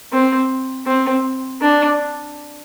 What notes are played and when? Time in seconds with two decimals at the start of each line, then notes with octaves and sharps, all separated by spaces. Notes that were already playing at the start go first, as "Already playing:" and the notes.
0.12 C4
0.87 C4
1.61 D4